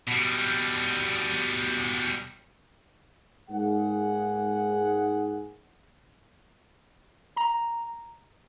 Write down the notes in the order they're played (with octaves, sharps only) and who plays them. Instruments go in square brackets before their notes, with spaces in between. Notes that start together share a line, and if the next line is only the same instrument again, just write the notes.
[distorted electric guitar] B2 G3
[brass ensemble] G#2 A#3 G#4 F#5
[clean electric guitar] A#5